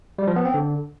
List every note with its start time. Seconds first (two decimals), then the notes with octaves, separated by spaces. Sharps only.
0.19 G3
0.27 F3
0.36 B3
0.45 C4
0.54 D3